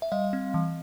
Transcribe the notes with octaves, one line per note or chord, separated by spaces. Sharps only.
E5
G3 D#5 F5
C4
E3